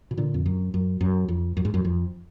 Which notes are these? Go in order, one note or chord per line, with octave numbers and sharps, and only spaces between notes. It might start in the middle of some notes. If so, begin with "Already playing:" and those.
B2
A#2 D3
F2
F#2
F#2
F#2
F2
F#2
G#2
F#2
F2